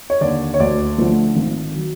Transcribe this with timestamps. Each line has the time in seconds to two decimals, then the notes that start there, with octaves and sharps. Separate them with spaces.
0.10 C#5
0.21 D#2 D3 D5
0.54 C#5
0.60 D2 D5
0.98 D3 F3 A3
1.36 G#1
1.74 D#3 F#3